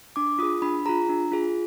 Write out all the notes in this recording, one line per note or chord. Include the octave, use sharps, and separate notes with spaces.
D4 D6
F4 G#4 D#6
D4 B5
F4 G#4 A#5
D4
F4 G#4